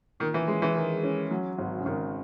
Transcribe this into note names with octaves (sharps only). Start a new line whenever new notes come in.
A#2 D#3
E3
G#3 C#4
E3
D#3 G#3
C#4
F#3
G#1
C#3
G#1 D#3